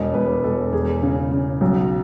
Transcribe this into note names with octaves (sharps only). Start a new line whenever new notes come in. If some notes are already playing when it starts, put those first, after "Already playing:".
Already playing: E1 E2 D#5
E1 B4
E1 A4
E2 G#4
C#3
C#3
B1